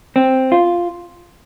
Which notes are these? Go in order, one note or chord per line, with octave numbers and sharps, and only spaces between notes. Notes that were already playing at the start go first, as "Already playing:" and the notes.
C4
F4